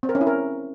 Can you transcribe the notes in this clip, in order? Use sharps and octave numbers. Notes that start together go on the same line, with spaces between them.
C4
A#4
C#4
E4
A#4